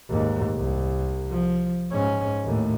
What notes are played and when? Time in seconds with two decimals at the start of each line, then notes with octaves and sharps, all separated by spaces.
0.10 D#2 G#2
0.55 C2
1.30 F3
1.91 G#2 C#4
2.44 D#2 A2